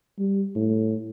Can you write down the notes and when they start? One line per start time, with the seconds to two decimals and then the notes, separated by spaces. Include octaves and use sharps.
0.19 G3
0.55 A2